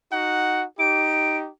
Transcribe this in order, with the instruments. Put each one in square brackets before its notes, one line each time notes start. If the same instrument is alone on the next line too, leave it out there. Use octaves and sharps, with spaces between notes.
[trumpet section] D#4 F#4 F#5
[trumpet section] D#4 G4 [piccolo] D7